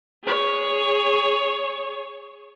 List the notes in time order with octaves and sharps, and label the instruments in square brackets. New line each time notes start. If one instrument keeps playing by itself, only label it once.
[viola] G#4 C#5